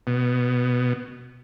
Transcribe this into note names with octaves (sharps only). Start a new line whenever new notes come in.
B2